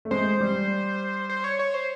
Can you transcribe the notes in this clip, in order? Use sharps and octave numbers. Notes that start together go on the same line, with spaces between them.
A3
G#3 C5
G3
C5
C#5
C#5
C5